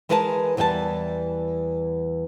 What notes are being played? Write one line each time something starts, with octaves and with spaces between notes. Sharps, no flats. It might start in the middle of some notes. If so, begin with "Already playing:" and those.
E3 G#3 A#4 B4 E5 A5
E2 E3 G3 G5 A5